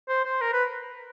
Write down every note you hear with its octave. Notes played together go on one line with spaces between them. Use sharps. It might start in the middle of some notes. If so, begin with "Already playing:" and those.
C5
C5
A#4
B4